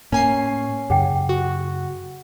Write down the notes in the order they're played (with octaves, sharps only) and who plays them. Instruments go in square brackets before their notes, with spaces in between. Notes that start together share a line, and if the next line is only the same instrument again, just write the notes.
[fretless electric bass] A2 A#3 [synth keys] C#4 G#5 C7
[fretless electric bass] F#2 C#3 [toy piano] G#4 F#5 G5
[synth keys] F#4